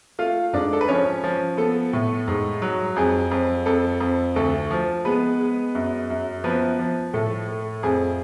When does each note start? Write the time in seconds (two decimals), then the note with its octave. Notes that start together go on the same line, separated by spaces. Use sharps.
0.19 A3 F4 F5
0.53 G#2 D4 D5
0.73 A4
0.81 B4
0.88 F3 C#4 C#5
1.24 F3
1.57 B3 A4
1.93 A2
2.28 G#2
2.62 F#3
2.96 F2 G#4
3.31 F2
3.66 F2 A4
4.00 F2
4.36 D2 A4
4.71 F3
5.05 G#3 B3 B4
5.40 G#3
5.75 F#2
6.10 F#2
6.44 F3 B3 B4
6.79 F3
7.14 A2 A4
7.48 A3
7.83 F2 G#4